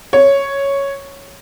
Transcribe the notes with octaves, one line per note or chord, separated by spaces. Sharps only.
C#5